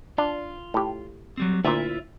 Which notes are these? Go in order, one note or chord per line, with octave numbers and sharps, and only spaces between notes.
D4 F4
A2 G4
F#3 G3 C4
D2 A#2 E4 F4 E5